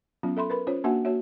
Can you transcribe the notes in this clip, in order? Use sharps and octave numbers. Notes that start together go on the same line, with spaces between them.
F#3 B3 C#4 F4
A4 E5 B5 C6
A#4 B4 B5
C#4 F4 C5 C#5
A#3 D4 F#4 E5 F#5 G#5
A#3 F#4 C#5 E5